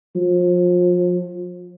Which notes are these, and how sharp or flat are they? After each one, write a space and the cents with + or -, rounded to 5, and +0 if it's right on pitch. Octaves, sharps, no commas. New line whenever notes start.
F3 +30